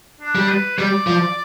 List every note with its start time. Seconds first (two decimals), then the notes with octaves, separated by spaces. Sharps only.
0.21 D4
0.35 G3
0.49 B4
0.78 G3 D5
1.07 F3